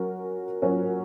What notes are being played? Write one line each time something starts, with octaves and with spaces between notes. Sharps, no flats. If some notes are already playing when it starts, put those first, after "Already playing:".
Already playing: F#3 C#4 F#4 A#4
F#3 C#4 F#4 A#4